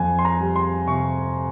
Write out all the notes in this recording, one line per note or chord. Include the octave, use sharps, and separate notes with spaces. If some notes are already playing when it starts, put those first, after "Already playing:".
Already playing: F2 G#5
C6
A#5
G3
C6
C3 C#6